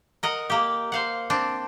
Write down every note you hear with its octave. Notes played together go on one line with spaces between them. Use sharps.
A#4 D#5 F#5
A#3 G4
C5 F5 F#5
C4 D4